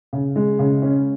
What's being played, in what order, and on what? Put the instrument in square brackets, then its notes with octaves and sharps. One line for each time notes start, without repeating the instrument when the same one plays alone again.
[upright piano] C#3
G#3
C#3
C#4